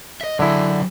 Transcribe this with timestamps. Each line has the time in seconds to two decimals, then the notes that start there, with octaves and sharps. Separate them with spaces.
0.21 D#5 E5
0.39 D3 F#3 E4 G#4